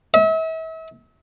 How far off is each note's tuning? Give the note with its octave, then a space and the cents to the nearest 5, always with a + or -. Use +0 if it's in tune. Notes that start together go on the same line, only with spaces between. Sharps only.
E5 -40